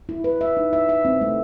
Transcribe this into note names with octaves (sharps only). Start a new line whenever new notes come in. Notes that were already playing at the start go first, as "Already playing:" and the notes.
E4
B4
E5
D#4
E5
E5
C4
A3